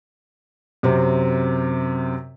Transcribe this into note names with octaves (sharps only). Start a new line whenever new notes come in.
F#2 C3 C4